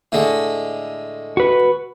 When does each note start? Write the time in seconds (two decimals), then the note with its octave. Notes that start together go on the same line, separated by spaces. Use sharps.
0.12 A2 D3 G#3
1.37 F#4 B4